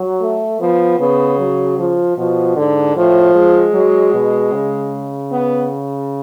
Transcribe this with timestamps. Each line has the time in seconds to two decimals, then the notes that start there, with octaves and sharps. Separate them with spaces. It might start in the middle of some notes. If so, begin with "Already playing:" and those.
Already playing: F#3
0.21 A3
0.60 F3 B3
0.99 C#3 B3
1.39 F#3
1.78 F3
2.17 B2 F3
2.56 G#2 D3
2.96 A2 F3
3.35 G#3
3.74 F#3
4.14 B2
4.53 C#3
5.31 B3